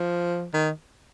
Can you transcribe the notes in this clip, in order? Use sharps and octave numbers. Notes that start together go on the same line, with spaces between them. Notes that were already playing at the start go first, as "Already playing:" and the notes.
Already playing: F3
D#3